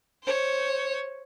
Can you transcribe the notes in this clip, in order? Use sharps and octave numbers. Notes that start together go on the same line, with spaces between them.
C5 C#5